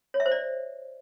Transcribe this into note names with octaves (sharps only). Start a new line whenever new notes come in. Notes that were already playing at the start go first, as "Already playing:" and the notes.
C#5
E5
C5
D5